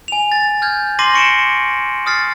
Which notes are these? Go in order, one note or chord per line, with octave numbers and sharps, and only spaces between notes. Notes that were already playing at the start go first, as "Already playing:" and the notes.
G#5 F7
A6
F6 G6 G#6
C6 D6 A#6 C7 D#7 F#7
C#6 C#7 D7 E7
D#6 F6 A6 C7